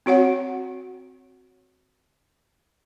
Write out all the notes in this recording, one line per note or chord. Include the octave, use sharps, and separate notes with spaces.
C4 F#4 C#5 F#5